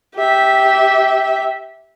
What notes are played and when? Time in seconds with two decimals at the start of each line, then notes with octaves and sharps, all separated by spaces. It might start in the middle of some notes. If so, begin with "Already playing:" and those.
0.16 G4 E5